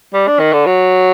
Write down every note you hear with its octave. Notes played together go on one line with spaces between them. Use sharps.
G3
D4
D#3
D3
F#3